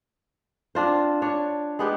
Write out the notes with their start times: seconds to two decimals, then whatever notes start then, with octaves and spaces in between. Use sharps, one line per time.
0.75 C4 D4 F4 C5
1.22 D4 C#5
1.79 G#3 B3 G4